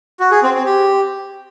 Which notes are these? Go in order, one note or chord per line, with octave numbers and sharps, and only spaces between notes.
F#4
G#4
C4
C4
G4